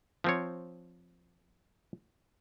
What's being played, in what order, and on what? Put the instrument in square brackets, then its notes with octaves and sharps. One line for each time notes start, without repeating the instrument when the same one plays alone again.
[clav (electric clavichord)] F3 C4 C#5